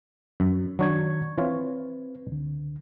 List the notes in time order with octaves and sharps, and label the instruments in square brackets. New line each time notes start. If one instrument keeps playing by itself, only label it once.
[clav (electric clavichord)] F#2
[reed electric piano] D#3 C#6 G#6 [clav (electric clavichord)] F#3 D4
[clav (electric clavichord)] E3 F4 C#5 [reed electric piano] C4 B4
[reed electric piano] C#2 D3